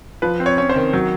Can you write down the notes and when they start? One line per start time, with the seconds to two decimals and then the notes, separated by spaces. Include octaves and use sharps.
0.22 F3 B4
0.40 C4
0.46 C#5
0.58 C#4 C#5
0.69 C5
0.76 D#3
0.93 F#3